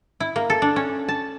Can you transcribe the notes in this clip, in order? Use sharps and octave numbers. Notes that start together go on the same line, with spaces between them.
E4
A#3
A4
D4
C#4
A5